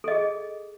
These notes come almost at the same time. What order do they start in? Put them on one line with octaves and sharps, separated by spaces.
A4 D#5 G#4